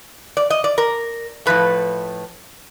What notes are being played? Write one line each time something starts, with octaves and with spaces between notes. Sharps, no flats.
D5
D#5
D5
A#4
A2 F3 A3 B4